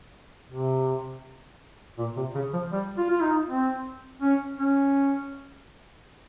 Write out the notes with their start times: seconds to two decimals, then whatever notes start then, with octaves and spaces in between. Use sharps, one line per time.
0.49 C3
1.98 A#2
2.17 C3
2.35 C#3
2.53 F3
2.72 G3
2.98 F4
3.10 F4
3.22 D#4
3.47 C4
4.21 C#4
4.58 C#4